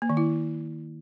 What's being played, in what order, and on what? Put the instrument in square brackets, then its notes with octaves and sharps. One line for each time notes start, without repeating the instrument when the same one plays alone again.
[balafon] A#3
D#3
E4